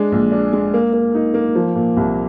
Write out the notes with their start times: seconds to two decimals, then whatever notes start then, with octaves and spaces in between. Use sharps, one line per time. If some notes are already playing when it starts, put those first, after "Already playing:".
Already playing: G#3 D4
0.12 A#1
0.32 D4
0.53 G#3
0.74 A#3
0.93 A#3
1.15 D#4
1.34 A#3
1.55 F3
1.75 A#2
1.97 C2